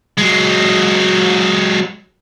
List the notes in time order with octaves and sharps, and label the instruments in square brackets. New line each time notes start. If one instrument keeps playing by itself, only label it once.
[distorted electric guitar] F#3 G#3